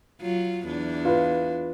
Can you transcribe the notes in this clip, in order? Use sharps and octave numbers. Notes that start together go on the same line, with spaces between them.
F#3 F4
E2 D4
F4 B4